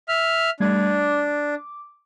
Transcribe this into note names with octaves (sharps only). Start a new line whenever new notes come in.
E5 F6
G3 A3 D4 G#6
D6